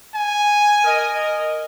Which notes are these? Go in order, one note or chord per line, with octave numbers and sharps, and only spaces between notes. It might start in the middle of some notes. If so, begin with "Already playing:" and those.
G#5
A#4 D#5